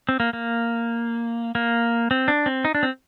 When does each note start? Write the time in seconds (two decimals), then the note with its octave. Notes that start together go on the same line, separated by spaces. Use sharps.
0.09 C4
0.20 A#3
0.33 A#3
1.55 A#3
2.11 C4
2.28 D4
2.46 C4
2.65 D#4
2.75 D4
2.83 C4